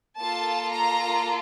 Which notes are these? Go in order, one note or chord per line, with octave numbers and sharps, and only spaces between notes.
A#3 F4 A4 A5
A#5